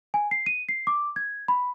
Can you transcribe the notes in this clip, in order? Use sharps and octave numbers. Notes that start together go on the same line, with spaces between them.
G#5
C7
D#7
C7
D6
G#6
B5